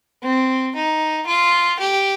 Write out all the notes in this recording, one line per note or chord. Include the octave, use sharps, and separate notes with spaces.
C4
D#4
F4
G4